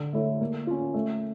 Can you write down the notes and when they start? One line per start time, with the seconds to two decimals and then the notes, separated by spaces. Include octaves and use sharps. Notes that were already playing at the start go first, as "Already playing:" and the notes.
Already playing: D3
0.13 A3 E4 A4 C#5
0.41 A#3
0.67 C#4 F4
0.94 A3